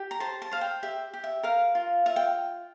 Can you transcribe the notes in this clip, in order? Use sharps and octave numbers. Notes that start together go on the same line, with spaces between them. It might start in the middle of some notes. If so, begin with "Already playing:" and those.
Already playing: G4
A#5
C5 A5
A5
C5 F5
G5
G4 E5
G4
E5
A#4 F5
F4
F4 E5
G5